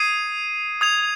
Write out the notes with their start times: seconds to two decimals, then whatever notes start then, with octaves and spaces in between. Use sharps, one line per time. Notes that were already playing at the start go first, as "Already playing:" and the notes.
Already playing: D#6 G#6 C7 D#7
0.81 D#6 G#6 F7